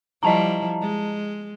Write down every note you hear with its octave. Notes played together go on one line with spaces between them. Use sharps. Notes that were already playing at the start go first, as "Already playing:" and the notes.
F3 G3 E4 D#5 A5 A#5
G#3